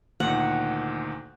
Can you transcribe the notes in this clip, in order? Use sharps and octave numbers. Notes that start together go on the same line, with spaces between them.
D2 A#2 D#3 F#5